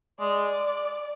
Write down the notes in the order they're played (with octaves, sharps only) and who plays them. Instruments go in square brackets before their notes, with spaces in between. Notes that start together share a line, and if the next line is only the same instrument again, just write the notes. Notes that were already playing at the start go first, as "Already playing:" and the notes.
[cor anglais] G#3 [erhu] D5